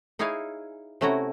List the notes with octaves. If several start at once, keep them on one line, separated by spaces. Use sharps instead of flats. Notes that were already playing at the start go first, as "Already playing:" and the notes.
D#4 E4 G#4 C#5 F5 G#5
C3 A3 C#4 E4 F#4 A#5